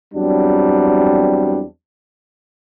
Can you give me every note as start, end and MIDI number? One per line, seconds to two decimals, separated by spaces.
0.14 1.63 40
0.14 1.63 54
0.14 1.63 55
0.14 1.63 60
0.14 1.63 62